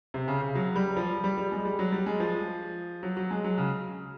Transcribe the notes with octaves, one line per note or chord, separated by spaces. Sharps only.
C3
C#3
C#3
F#3
G3
F3
G3
G3
G#3
G3
F#3
G3
G#3
F3
F#3
F#3
G#3
F#3
C#3